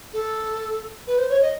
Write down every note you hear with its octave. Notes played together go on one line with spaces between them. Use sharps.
A4
B4
C5
C#5
D#5